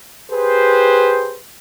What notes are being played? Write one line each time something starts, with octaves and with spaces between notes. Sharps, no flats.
G4 G#4 B4 C5